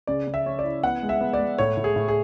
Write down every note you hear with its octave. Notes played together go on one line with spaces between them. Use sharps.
C#3 D5
C#3
E5
C#4
D5
E4
B3 F#5
G#3
E5
B3
D5
G#3
A2 C#5
A2
G#4
A2
G#4